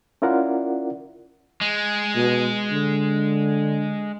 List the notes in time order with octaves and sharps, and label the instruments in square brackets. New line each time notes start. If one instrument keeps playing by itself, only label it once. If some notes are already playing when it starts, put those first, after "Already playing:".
[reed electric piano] C#4 E4 F4 A#4 D5 F#5
[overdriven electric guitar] G#3
[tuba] B2
D3